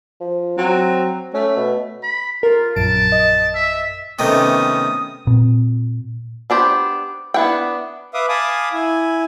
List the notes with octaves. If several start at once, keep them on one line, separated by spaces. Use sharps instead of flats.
F3
F#3 C4
A3 C#4
B2
B5
F4 A#4
A#1 F#2 A5 D7
D#5
E5
C3 D#3 A3 B3 C#4 D#6
A#2 C4
B3 D4 G4 C5
B3 D4 E4 F#5 G5
B4 E5 F5 D6 D#6
F5 G#5 A5 B5 D6 D#6
E4 G#5